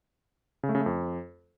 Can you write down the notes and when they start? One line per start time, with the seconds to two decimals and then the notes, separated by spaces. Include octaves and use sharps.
0.63 C#3
0.69 A3
0.75 C#3
0.80 A3
0.86 F2